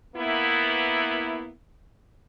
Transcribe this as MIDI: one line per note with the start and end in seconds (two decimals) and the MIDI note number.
0.16 1.50 58
0.16 1.50 59
0.16 1.50 64